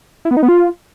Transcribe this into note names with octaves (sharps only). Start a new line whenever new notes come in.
E4
B3
D#4
B3
F4